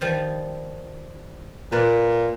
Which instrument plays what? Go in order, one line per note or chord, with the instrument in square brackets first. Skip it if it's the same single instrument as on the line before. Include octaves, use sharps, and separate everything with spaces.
[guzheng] D#3 F3 G3
[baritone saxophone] A#2 [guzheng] B4 D5